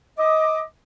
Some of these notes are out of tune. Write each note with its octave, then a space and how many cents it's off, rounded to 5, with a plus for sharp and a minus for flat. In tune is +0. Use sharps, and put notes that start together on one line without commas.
D#5 +25 D6 +20